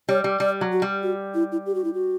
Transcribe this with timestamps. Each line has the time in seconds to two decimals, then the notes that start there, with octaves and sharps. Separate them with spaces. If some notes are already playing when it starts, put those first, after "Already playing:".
0.09 G3 C#5
0.24 G3
0.40 G3 D5
0.61 F#3
0.72 F#4
0.82 G3
1.03 F#4
1.34 E4
1.52 E4
1.66 G4
1.75 F#4
1.84 E4
1.94 F#4